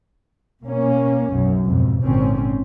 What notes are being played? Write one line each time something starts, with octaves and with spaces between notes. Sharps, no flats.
B2 A#3 C#4
B1 F#2
F2 G#2 B2
G#1 A#2 D3 C4 C#4